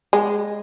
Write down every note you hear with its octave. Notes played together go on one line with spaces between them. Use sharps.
G#3